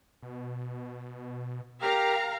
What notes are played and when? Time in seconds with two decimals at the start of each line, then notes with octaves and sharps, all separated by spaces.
0.22 B2
1.82 G4 A#4 F5 A#5